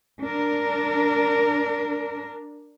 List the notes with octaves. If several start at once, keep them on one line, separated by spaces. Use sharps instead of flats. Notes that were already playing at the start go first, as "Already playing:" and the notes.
D4 A#4